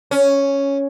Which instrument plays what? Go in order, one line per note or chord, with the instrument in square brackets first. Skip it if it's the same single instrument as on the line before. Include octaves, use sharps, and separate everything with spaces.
[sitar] C#4